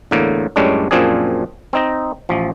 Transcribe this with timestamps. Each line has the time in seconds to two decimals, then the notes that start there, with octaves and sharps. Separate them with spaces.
0.11 E2 A2 D3 A#3
0.56 F#2 A2 G3 G#3 C#4 D4
0.91 F#2 A#2 F3 C4 D4 G#4
1.73 C4 D#4 D#5
2.29 A1 F3